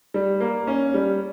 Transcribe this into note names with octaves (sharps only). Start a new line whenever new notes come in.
G3
A#3
C#4
G3